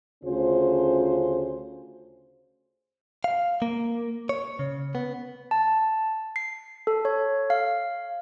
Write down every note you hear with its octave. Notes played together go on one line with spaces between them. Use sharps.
D2 C#3 C#4 F4 C5
F5
A#3
C#5
C#3
B3
A5
C7
A4
C#5
F5